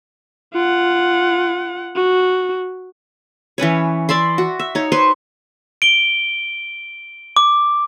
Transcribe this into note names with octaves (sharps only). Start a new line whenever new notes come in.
F4 F#5
F#4
E3 C#4 B4 C#5
D5 E5 B5 C6
F#4
E5
D#4 C#5
B4 C5 C6 C#6
D7 G7
D6